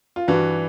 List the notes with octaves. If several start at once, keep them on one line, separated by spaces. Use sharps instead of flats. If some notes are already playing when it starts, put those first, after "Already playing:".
F4
G2 E3 F#4